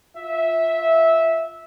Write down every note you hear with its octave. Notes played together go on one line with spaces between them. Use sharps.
F4 E5